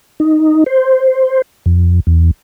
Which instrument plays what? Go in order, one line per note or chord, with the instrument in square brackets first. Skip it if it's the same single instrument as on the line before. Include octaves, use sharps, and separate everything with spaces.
[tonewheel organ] D#4
C5
F2
E2